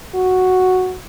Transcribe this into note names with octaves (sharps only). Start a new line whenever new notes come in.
F#4